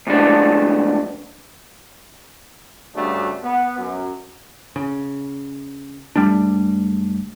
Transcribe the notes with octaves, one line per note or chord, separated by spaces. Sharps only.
D2 G#2 D4
D2 G2 C#3 A3 D4 F#4
B3
F#2
C#3
F#1 G3 A3 D4